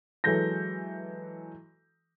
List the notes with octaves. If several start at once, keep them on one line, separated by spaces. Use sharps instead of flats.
E3 F#3 G#3 A4 G6 A#6